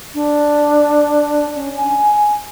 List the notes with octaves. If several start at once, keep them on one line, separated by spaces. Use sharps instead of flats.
D4
C#4
G#5